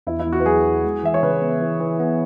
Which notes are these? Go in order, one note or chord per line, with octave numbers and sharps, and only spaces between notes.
E2 E4
E4
E2
F#4
B4
F#3 G#4
E4
G#3
E3 E5
C#5
C#3 B4
B3
E3
E3
B3